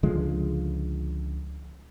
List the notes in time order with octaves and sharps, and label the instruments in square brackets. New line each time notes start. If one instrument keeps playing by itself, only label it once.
[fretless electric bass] C#2 D3 F3 G#3